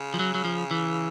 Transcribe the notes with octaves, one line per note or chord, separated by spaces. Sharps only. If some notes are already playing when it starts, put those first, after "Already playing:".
Already playing: C#3
F3
F#3
F#3
F3
E3